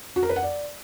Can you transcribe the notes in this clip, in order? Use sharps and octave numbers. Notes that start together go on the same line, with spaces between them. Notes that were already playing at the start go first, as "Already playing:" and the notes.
F#4
A#4
B4
F#5
D5